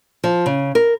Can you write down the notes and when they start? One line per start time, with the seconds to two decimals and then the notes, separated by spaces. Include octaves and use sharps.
0.24 F3
0.46 C#3
0.75 A#4